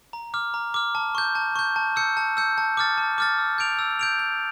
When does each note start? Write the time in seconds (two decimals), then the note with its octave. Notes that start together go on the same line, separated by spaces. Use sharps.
0.13 A#5
0.34 D6 F6
0.54 A#5
0.74 D6 F6
0.95 A5
1.15 C#6 G6
1.35 A5
1.56 C#6 G6
1.76 A5
1.96 E6 G6 C#7
2.17 A5
2.37 E6 G6 C#7
2.58 A5
2.77 D6 F6 A6
2.98 A5
3.18 D6 F6 A6
3.38 E6
3.58 G6 D7 F7
3.79 E6
3.99 G6 D7 F7
4.19 G6